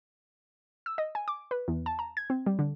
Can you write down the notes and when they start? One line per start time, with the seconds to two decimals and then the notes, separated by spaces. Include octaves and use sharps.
0.86 E6
0.98 D#5
1.15 G#5
1.28 D6
1.51 B4
1.68 E2
1.86 A5
1.99 A#5
2.17 G#6
2.30 C4
2.46 G3
2.59 D3